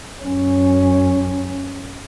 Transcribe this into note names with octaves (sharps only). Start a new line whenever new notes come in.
F#2 C#4